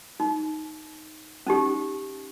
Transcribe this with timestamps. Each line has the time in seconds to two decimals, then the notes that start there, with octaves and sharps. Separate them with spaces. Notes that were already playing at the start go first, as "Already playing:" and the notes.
0.20 D#4
1.47 C#4 D#4 G4